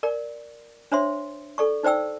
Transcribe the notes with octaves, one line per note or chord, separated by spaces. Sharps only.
A#4 D5
D4 C5 C#5 E5 C6
A4 D5 C#6
D#4 C5 D5 G5 E6